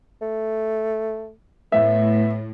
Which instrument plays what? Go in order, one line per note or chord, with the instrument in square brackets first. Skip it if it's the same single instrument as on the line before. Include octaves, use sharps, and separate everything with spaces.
[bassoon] A3
[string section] A2 [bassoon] B3 [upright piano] E5